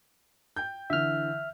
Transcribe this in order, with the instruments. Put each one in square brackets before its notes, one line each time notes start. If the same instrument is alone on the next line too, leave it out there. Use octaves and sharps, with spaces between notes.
[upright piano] G5 G6
[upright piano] D3 E3 [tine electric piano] E5 F6